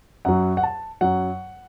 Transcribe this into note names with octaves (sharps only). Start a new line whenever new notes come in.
F#2 F#3 F#5
F#5
A5
F#2 F#3 F#5